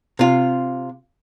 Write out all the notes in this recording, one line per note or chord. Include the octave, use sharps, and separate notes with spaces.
C3 F4